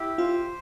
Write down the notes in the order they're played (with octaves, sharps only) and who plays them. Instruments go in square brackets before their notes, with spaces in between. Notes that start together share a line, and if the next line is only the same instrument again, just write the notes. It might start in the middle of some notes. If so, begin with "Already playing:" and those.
Already playing: [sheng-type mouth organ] E4 G4
[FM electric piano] F4 F5 [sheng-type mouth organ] C5